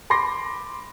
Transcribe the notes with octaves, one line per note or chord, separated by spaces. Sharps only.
B5 C6 D6 A#6 C7